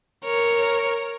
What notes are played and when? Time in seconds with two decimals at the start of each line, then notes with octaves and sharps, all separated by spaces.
0.25 A#4 C#5